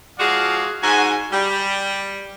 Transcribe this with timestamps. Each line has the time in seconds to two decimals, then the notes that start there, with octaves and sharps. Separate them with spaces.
0.19 F3 G#3 F#4 G#4 D5 F5
0.82 G#2 F#4 G#5
1.32 G3